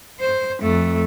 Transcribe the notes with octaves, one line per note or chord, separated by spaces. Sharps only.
C5
F2 A3